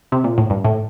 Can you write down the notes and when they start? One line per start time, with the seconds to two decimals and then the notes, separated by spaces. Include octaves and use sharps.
0.12 C3
0.24 A#2
0.38 A2
0.50 G2
0.64 A2